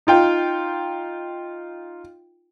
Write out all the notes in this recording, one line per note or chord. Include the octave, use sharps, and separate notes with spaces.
D#4 F4 G5